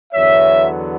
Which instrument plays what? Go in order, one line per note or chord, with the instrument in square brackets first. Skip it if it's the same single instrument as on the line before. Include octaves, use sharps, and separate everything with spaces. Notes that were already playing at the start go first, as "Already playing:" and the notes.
[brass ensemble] E2 D3 F#3 B3 C#5 E5